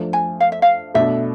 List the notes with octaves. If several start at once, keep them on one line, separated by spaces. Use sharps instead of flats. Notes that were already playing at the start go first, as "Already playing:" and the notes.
Already playing: F3 A3 D4
G#5
F5
E5
F5
B2 A3 D4 A4 E5